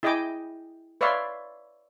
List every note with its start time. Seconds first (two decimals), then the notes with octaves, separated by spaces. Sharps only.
0.03 E4 G#4 D#5 G5 G#5 D6
1.01 B4 C#5 D5 E5 F5 C6